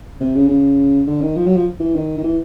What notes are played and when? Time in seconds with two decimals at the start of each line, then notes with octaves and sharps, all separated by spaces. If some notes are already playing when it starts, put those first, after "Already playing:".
0.20 C3
0.35 C#3
0.49 C#3
1.07 D3
1.21 D#3
1.36 F3
1.47 F#3
1.56 F3
1.80 E3
1.95 D#3
2.18 D#3
2.23 E3